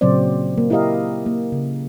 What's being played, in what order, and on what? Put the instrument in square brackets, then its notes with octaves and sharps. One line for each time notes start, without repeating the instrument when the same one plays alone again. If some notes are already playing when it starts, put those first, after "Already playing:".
[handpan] A#2 C#3 F#3 C4 C5 D5
A#3
E4 G4 A#4 D#5 F5
A#3
C#3